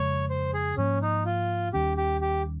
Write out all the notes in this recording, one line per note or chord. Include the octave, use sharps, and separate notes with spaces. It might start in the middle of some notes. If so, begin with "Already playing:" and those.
Already playing: F2 C#3 G#3 C#5
C5
G#4
G#2 F3 A#3 C#4
D#4
F4
D#2 D#3 G3 C#4 G4
G4
G4